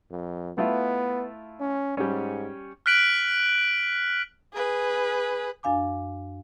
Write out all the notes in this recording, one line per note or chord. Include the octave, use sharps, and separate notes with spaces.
F2
A3 B3 E4 F4
C#4
G#2 G3 C#4
F6 F#6 B6 D7 F#7
G#4 B4
F#2 D4 F5 G#5 D6